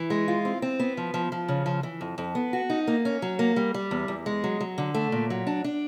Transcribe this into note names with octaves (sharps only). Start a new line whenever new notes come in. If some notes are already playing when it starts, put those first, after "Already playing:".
Already playing: E3
G#3
F4
C4
C4
B3
F3
F3
F3
C#3
F3
E3
F2
F2
B3
F#4
D#4
A#3
C#4
F#3
A#3
G3
G3
E2
E2
G#3
F#3
F#3
D3
A3
A#2
F#3
D4
D4